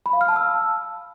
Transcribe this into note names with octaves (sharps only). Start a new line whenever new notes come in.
B5
F5
F6
A5
E6